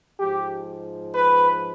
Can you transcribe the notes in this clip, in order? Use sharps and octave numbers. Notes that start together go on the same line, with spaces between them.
G#2 F3 G4
B4